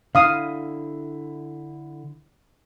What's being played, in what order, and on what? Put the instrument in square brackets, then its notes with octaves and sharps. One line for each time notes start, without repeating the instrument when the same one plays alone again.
[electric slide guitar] D3 E4 E5 [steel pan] F5 D#6